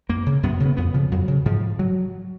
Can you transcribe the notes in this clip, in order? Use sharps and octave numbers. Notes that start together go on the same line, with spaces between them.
F#2 A#3
C#3
F#2 B3
C#3
B3
F2 B3
C#3 F3
F2 F#3
C#3
G#2 F3
F#3